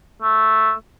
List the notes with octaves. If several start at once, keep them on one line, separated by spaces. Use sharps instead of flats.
A3